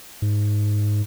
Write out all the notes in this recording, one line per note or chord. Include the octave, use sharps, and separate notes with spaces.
G#2